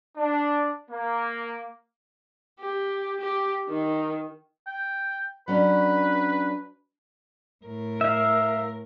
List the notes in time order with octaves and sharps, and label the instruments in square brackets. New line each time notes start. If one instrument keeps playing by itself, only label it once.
[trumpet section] D4
A#3
[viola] G4
G4
D#3
[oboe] G5
[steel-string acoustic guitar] F#3 C#4 D4 [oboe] B4
[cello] A2 A#4
[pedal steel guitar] E5 F5